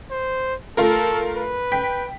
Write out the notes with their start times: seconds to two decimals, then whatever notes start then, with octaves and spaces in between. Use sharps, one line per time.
0.10 C5
0.77 A3 F4 A4 A#4
1.37 B4
1.72 G5 B6